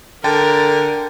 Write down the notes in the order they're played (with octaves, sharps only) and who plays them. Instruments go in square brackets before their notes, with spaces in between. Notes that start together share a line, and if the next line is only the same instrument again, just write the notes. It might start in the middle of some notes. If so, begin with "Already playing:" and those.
[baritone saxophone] D3 [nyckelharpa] A#4 [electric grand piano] G5 A5 A6